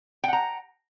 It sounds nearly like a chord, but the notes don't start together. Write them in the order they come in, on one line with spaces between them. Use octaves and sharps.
G5 F#5 A#5